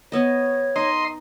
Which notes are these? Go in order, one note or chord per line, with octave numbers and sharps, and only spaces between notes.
B3 C#5 D#5
D#4 D#5 C6